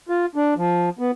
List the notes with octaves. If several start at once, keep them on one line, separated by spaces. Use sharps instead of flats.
F4
D4
F3
B3